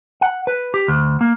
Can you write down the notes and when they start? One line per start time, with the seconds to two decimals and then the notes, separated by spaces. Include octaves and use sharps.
0.21 F#5
0.47 B4
0.74 G4
0.88 D2
1.21 A#3